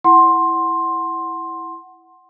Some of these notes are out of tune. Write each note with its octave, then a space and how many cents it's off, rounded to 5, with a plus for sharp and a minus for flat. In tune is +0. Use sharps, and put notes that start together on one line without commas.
E4 +0 F#5 +5 C6 +10